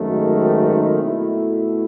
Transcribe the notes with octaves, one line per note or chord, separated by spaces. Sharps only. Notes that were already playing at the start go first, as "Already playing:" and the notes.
Already playing: G#1 F#2 D#3 A3
B2 A3 E4